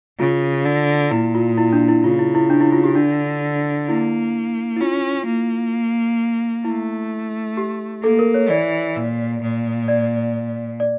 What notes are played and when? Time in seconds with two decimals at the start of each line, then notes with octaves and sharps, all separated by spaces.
0.19 C#3 F4
0.65 D3
1.11 A#2 E4
1.35 F4
1.57 E4
1.73 D4
1.88 E4
2.03 C#3 F4
2.19 E4
2.35 E4
2.50 D4
2.61 E4
2.73 F4
2.84 G4
2.95 D3 D4
3.88 A#3 E4
4.76 E4
4.80 C#4 F4
5.26 A#3
6.65 A3 E4
7.57 G4
8.03 A#3 A4
8.19 A#4
8.34 C#5
8.49 E3 D5
8.96 A#2
9.42 A#2
9.88 D5
10.80 D5